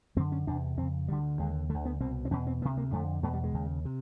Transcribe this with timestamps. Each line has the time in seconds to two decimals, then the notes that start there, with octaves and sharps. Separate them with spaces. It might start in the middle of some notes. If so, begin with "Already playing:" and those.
0.16 F#2 D3 C4
0.32 C#4
0.47 E2 C3 D4
0.77 F2 C4
0.82 C#3
1.08 D2 D3 G3
1.39 D#2 D3 G#3
1.69 D3 A3
1.74 D2
1.85 B3
2.00 C2 B2 C4
2.25 C4
2.31 E2 B2 C#4
2.47 C4
2.61 D2 B3
2.65 C3
2.77 A#3
2.92 F2 D3 A3
3.23 E2 B2 A3
3.33 G3
3.44 G#3
3.53 D#2 C#3
3.85 C3